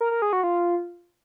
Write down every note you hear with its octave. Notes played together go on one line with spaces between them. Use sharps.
A#4
A#4
G#4
F#4
F4